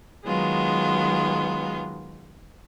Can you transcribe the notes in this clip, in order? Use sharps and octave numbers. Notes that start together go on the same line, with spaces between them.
D#3 F#3 G#3 B3 F4